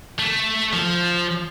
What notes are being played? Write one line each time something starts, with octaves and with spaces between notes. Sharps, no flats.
A3
F3